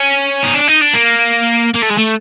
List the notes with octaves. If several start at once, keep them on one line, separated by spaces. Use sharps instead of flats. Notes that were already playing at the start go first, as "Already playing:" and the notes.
Already playing: C#4
D#4
D4
D#4
D4
A#3
A#3
A3
G#3
A3